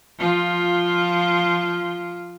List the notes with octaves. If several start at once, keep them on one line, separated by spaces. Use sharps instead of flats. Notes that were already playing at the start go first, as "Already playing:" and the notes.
F3 F4